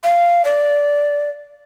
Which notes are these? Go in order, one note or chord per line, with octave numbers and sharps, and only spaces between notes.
F5
D5